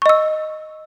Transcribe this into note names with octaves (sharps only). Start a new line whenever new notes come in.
D#5 C#6 E6